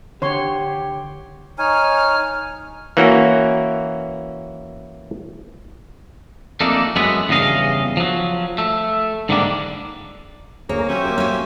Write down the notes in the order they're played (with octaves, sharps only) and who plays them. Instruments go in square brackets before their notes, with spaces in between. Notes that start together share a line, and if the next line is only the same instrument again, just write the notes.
[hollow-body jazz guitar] D3 [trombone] G4 [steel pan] C#5 C6
[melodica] D#4 C#5 G#5 [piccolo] F6
[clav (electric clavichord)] E3 A#3 C#4 F#4
[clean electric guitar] F2 A3 A#3 D4 D#4
F#2 G#3 A3 B3
E2 G2 C#3 D#5 F5
F3 F#3
A3
G#2 D3 D#3 G3 A#3 D4
[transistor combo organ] D2 G#4 A#5 [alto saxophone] A#3 [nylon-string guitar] C#5
[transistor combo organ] F#3 [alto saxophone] C#4 [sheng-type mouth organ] G4 C5 E5
[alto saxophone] A#3
[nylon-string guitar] C#4 G#5